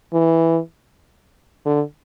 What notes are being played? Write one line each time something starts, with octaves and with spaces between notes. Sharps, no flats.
E3
D3